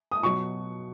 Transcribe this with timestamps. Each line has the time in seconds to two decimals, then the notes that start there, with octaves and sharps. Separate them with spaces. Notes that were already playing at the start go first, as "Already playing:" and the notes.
0.12 D#6
0.23 B2 F#3 C#6